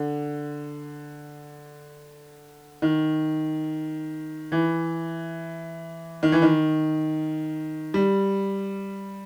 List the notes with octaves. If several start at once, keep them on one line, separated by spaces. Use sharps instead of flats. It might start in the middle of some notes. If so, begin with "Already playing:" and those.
Already playing: D3
D#3
E3
D#3
E3
D#3
G3